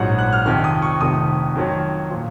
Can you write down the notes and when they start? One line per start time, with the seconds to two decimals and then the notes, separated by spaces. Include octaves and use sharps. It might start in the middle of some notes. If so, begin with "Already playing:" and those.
Already playing: A#1 G#2 F#3 F#5
0.19 F#6
0.33 F6
0.46 F2 C3 D#3 F6
0.64 D#6
0.82 C#6
1.01 F1 F2 C3 D#3 D#6
1.55 F2 D#3 F#3
2.10 A#2 F3